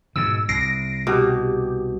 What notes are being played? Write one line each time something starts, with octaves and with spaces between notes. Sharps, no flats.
G#2 B2 E6
C2 A#6 C7 D7
B2 G4